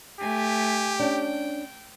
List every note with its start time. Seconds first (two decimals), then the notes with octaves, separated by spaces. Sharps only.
0.20 A3 G4 G#5
0.99 C#4 D4 G5